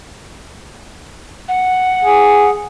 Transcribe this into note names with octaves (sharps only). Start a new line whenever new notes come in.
F#5
G#4